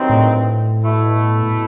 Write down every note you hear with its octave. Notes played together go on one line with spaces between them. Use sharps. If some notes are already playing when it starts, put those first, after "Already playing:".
Already playing: G2 D#3 F#3 C4 D#4
A2
B2 A3 E4